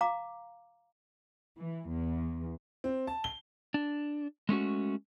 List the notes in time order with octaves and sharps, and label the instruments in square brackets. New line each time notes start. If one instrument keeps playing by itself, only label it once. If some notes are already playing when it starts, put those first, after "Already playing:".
[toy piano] F5 A#5 D6
[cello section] E3
E2
[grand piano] C4
A5
G7
[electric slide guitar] D4
G#3 A3 C#4 F#4